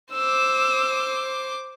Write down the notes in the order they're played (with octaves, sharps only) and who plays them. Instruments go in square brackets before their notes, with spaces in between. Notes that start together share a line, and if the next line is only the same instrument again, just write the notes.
[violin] C5 D6 [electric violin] E6